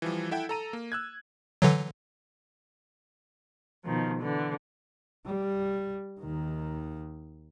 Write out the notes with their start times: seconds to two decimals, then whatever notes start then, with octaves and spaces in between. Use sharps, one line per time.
0.02 E3 F3 G3
0.31 E4 A4 E5 F#5 G5
0.49 A4 A#5 D#7
0.73 A#3
0.92 E6 F#6 G#6
1.62 D3 E3 F#3
3.86 B2 D#3 F3
4.22 D3 E3
5.26 G3
6.20 D#2 D#3